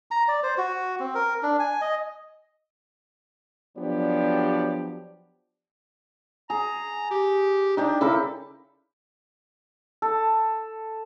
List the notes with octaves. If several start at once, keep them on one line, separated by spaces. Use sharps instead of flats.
A#5
D5
C5
F#4
C4
A#4
D4
G#5
D#5
F3 F#3 B3 D4 G4 D5
G#4 A#5
G4
D4 D#4 G4 D5
C#3 E4 A4 A#4
A4